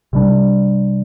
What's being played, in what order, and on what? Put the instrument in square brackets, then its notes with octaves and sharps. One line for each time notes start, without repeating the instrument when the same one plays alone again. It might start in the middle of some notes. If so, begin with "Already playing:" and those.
[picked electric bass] C3 G3 D4